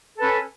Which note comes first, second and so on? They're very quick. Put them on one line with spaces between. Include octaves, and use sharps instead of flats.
A4 B4 C#4